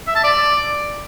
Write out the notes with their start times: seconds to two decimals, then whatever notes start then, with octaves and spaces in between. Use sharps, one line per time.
0.07 E5
0.16 A5
0.24 D5